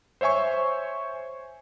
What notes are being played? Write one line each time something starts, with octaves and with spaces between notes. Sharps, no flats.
C5 C#5 E5 G#5 C#6